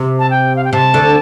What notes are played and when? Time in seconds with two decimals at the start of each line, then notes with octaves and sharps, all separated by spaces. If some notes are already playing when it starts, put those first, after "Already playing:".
Already playing: C3
0.19 A5
0.30 G5
0.56 F5
0.65 G5
0.73 C3 A5
0.94 D2 D3